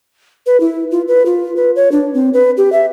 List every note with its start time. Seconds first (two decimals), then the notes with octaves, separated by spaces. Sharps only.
0.46 B4
0.60 E4
0.91 F4
1.08 B4
1.26 F4
1.56 B4
1.76 C#5
1.92 D4
2.14 C4
2.34 B4
2.57 G4
2.72 E5